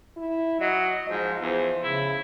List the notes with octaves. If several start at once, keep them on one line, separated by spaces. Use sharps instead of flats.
E4
F#3 D#5
G#2 F3
E2 C5
C#3 E4